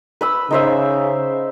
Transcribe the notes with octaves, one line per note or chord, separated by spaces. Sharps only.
B4 B5 E6
C#3 D#4 C5 E5